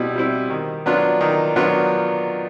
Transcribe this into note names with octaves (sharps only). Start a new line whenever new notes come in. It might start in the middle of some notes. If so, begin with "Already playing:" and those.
Already playing: B2 G3 C4 E4
G3 C4 E4
D#3
F#3 B3 D4 F4
D#3
F#3 B3 D4 F4